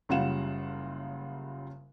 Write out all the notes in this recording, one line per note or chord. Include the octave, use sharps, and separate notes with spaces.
F#1 C#3 G3 F4 F#5 E7